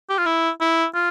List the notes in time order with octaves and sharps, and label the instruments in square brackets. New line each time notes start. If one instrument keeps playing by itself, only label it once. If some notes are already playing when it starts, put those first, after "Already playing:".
[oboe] G4
F4
E4
E4
F4